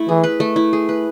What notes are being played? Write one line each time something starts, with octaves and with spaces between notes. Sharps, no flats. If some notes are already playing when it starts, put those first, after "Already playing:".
Already playing: A3 E4
E3 G#4
B4
A3
E4
G#4
B4